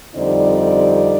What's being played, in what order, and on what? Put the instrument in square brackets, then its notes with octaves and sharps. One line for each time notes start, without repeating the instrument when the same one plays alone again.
[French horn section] F2 D3 G3 C4 D#4 D5